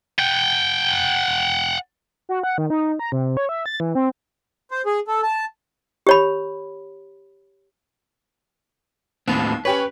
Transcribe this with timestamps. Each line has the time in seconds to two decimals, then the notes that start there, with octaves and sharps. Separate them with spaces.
0.19 F#5 G5
2.29 F#4
2.43 F#5
2.58 D#3
2.70 D#4
2.99 A#5
3.12 C3
3.37 C#5
3.49 E5
3.66 A6
3.80 E3
3.95 C4
4.71 C5
4.86 G#4
5.08 A4
5.23 A5
6.07 G4 C#5 B5
9.28 D#2 A2 B3 C4
9.65 C#4 G4 B4 C#5